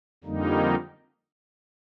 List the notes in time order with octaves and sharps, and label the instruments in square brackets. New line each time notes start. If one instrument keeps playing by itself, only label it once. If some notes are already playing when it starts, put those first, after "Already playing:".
[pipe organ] F2 D3 G3 A#3 D#4